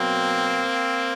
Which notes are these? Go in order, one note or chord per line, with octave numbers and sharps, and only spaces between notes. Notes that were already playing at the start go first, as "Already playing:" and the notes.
Already playing: B2 F#3 A#3 C4